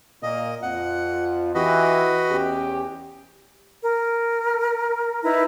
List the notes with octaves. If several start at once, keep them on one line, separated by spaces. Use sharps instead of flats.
A#2 A#3 D#5
F2 F4 F#5
E3 F#4 G4 B4 D#5
E2 C#4 G4
A#4
D#4 E4 B4 A#5